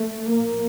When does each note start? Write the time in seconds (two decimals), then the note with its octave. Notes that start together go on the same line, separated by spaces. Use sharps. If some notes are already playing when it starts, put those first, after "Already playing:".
Already playing: A3
0.32 A#1 A2 A#3